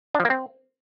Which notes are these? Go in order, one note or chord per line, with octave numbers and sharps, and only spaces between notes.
D4
F3
A#3
C4